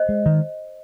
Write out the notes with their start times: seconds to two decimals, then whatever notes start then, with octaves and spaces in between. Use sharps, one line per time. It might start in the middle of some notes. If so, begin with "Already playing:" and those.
Already playing: C5 D#5
0.09 G#3
0.26 D#3